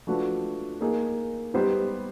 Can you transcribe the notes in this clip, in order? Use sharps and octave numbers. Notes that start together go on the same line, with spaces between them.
F3 A3 D4 F#4 B4
A#3 D#4 G#4
G3 B3 D#4 G4 C5